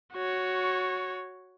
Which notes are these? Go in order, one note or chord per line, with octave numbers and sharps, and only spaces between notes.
F#4 C#5